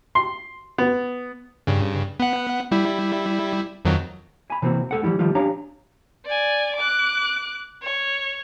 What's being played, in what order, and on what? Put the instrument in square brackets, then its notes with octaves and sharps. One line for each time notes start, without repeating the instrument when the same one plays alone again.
[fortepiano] C6
B3
[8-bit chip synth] G2 C#3
B3 F#5
G3 E4
F2 D#3 F#3
[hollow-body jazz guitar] G#5 B5
C3 E3 A#3 C4 F#4
A3 A4 F#5
E3 F3 G3 E4
D#3 F3 G3 A3 F4
C#4 D4 G4 C#5 F5 A#5
[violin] D5 G#5
D6 F#6
C#5